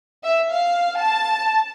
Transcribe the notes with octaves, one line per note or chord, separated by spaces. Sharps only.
E5
F5
A5